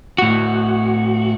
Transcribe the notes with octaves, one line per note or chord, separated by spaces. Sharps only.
A2 F#4